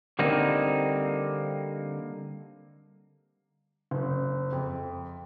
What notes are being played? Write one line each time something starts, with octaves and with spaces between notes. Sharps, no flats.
D3 G3 A#3 C4 D#4
F#1
F2